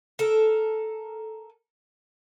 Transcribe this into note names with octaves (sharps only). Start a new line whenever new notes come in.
A4 A#4